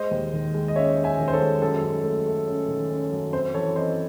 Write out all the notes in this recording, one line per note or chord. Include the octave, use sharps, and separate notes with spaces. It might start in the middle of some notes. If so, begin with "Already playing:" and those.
Already playing: G#3 C5 D#5
D#2
D#3
G#3
D#5
C#4 C#5 E5
C#4
E5 G#5
D#3
C5
A4 C#5
G#3
F#2 A4
F#2
A3
A3
C#4
D#3
C#4
F#2
C4 C5
E3 A4 C#5
C4 C5 D#5